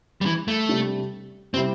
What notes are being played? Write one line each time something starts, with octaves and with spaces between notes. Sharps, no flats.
G3
E3
A3
C3 G3 D4
C3 G3 C4 E4